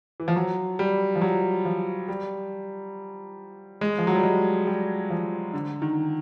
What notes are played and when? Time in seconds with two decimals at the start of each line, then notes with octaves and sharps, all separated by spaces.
0.20 E3
0.28 F3
0.36 F#3
0.79 G3
1.16 F3
1.21 F#3
1.65 F3
2.08 G3
3.81 G#3
3.98 F3
4.07 F#3
4.16 G3
4.23 G#3
4.67 G3
5.10 F3
5.54 D3
5.82 D#3